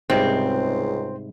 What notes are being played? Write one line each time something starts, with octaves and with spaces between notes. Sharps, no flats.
C#2 G#2 C3 G3 C4